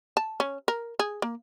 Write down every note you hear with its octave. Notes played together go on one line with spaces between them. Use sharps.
A5
C#4
A#4
G#4
A#3